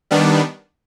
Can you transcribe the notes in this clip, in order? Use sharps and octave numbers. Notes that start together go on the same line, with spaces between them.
D#3 G3 B3 D4